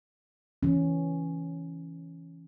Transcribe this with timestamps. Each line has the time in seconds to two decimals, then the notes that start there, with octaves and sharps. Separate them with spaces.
0.63 E3 C#4